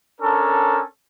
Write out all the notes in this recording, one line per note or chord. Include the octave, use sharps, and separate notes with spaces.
C#4 D4 A4 A#4